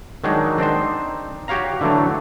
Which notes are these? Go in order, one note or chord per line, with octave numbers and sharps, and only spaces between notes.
D#3 F#3 G#3 D4 D#4
C4 D4 D#4 C5
F#4 G4 C#5 F5 A#5
D3 E3 F#3 A3 D4